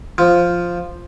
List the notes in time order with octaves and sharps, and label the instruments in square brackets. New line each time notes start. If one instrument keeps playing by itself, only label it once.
[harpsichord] F3